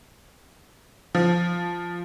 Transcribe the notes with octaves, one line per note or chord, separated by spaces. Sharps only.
F3